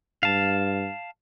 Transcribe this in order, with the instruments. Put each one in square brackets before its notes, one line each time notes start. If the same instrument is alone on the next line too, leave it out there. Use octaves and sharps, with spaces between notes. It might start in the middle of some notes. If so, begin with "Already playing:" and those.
[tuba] G2 [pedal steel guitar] F5 A5